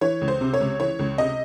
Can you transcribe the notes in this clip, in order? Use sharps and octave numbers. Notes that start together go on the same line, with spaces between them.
E3 C#5
C#2
C5
C3
C#5
C#2
E3 C#5
C#2
C3 D#5